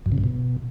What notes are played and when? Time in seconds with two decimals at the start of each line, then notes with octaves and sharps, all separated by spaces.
0.06 F#2
0.12 C#3
0.18 G2
0.24 B2